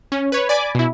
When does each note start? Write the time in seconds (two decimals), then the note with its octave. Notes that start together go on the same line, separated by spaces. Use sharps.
0.12 C#4
0.32 B4 C#5
0.49 D5 G#5 B5 D6
0.75 B2 E4